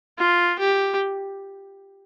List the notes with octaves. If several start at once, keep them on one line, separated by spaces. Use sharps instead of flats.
F4
G4